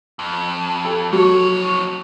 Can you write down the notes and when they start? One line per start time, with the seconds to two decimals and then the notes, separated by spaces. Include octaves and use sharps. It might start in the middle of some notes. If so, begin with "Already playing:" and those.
0.19 F2
0.85 A4
1.13 F2 F#3 C#5